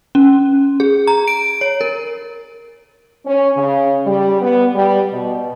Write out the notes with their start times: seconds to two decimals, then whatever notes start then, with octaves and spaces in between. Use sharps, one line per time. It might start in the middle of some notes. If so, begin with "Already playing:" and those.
0.15 C#4
0.80 G#4
1.07 A#5
1.28 D7
1.61 C#5
1.81 A#4
3.26 C#4
3.57 C#3
4.05 G3
4.41 B3
4.75 G3
5.12 B2